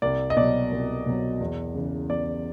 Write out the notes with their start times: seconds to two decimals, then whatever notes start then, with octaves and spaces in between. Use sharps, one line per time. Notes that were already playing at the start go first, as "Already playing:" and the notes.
0.02 C2 D5
0.30 D#5
0.37 B2 F#3 D5
0.72 C2
1.06 B2 F#3
1.41 E2
1.75 C#3 E3
2.09 E2 D5